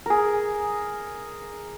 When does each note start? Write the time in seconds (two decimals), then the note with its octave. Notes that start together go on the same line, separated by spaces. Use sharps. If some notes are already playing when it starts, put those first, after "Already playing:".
0.06 G#4 A#4